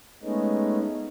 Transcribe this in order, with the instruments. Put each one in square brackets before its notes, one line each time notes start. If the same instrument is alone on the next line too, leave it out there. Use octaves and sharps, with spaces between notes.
[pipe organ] G#3 A3 B3 C#4 D#4